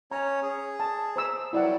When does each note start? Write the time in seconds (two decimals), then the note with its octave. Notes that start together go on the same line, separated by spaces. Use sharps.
0.11 C#4 C#5 A#5
0.43 G#4
0.80 A5
1.16 C5 A#5 E6
1.53 F#3 G3 E4 D5 F#5